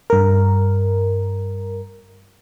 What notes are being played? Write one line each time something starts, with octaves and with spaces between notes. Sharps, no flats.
G2 A#4